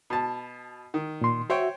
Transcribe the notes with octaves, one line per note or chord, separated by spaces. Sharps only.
B2 A5
D#3
A#2 C6
F#4 C5 C#5 E5 G5